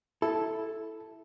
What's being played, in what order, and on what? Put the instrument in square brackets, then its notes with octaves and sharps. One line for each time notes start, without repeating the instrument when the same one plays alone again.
[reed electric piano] E4 [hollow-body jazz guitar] A4